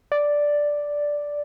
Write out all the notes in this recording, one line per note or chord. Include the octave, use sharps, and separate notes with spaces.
D5